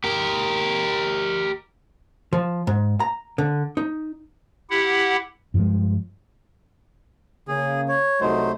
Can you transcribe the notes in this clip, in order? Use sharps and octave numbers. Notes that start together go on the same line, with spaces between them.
G4 A#4
F3
G#2
A#5
D3
D#4
E4 G4 F#5
G2 F3 G3 G#3
C#3 A#3 G#4
C#5
C2 F#3 A3 D#4 C5